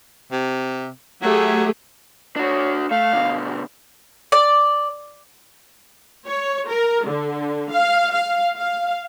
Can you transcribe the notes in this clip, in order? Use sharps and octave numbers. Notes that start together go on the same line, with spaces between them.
C3
F#3 A3 G4 G#4
D4 F#4 C#5
A3 F5
B2 D3
D5
C#5
A#4
D3
F5
F5
F5